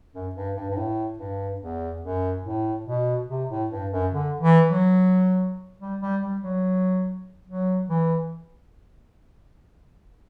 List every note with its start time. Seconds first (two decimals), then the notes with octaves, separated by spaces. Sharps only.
0.13 F#2
0.35 G2
0.56 G2
0.70 G2
0.77 A2
1.18 G2
1.61 E2
2.02 F#2
2.45 A2
2.86 B2
3.29 C3
3.50 A2
3.71 G2
3.91 F#2
4.12 D3
4.40 E3
4.68 F#3
5.80 G3
6.02 G3
6.21 G3
6.42 F#3
7.47 F#3
7.89 E3